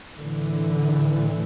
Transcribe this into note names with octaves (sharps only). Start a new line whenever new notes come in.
A2 D3 E3